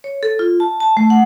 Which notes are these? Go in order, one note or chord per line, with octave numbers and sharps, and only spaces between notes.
C#5
A4
F4
A5
A5
A3
F#5